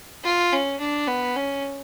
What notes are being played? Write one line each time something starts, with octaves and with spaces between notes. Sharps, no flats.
F4
C#4
D4
B3
C#4